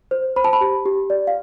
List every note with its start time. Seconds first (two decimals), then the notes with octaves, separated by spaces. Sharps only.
0.11 C5
0.36 C5 B5
0.44 A5
0.53 B5
0.61 G4
0.86 G4
1.10 D5
1.27 F5